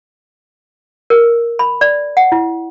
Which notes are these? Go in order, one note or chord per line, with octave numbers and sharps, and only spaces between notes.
A#4
B5
D5
F#5
E4